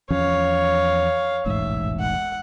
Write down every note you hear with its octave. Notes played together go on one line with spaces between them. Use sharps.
E2 F3 C#4 C#5 F5
E1 A1 G#2 E5
F#5